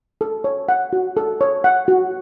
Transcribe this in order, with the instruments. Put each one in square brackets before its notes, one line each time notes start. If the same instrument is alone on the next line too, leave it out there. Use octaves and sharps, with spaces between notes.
[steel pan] A4
C#5
F#5
F#4
A4
C#5
F#5
F#4